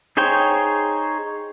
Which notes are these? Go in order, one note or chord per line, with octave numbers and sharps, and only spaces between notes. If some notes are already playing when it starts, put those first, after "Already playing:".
D#4 G#4 C5 C#5 G5